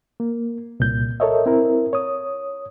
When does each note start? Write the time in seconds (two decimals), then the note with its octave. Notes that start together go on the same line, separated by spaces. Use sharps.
0.20 A#3
0.80 C2 A#2 G6
1.20 A4 A#4 C#5 D#5 E5
1.46 C4 E4 A#4
1.93 C#5 D#6